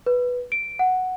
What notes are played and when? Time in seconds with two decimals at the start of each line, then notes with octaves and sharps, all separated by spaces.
0.06 B4
0.52 D7
0.79 F#5